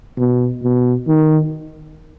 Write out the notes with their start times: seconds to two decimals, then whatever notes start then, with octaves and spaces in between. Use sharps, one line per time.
0.18 B2
0.63 B2
1.07 D#3